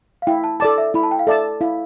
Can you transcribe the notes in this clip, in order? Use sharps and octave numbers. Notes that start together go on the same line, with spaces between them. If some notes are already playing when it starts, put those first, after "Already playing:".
F5
E4 G5
A5
A4 D5 A5 D6
E5
E4 B5
A5
G5
F5
A4 D5 E5 A5
E4 F5